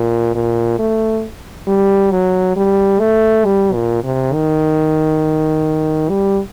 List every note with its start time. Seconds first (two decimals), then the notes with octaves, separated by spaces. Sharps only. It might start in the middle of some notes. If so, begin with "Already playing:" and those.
Already playing: A#2
0.35 A#2
0.79 A3
1.68 G3
2.12 F#3
2.57 G3
3.00 A3
3.45 G3
3.73 A#2
4.04 C3
4.33 D#3
6.10 G3